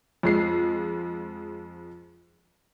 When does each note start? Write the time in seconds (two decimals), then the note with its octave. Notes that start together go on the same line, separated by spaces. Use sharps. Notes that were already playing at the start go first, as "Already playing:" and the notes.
0.23 F2 G#3 C7